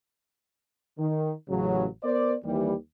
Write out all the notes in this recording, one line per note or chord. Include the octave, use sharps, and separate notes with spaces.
D#3
A1 C#3 F#3
B3 A#4 C5 D5
D#2 E3 G3